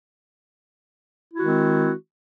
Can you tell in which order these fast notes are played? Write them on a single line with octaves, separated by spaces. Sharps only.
E4 F#4 D#3 G#3 C4